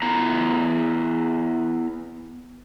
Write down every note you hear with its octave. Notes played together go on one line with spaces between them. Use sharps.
B3 E4 A#5